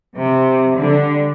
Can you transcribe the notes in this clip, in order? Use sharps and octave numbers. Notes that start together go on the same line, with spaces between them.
C3
D3 G3